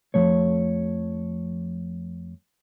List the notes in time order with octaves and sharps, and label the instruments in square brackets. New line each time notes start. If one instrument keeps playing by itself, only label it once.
[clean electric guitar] F2 A2 F3 A3 C#5